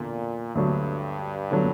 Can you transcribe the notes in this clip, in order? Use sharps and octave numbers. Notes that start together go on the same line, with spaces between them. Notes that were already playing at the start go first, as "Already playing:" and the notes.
Already playing: E2 A#2 D3 A#3
D2 G2 D3 F#3
D3 F#3